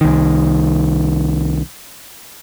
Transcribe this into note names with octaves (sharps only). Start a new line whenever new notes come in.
C2 D#3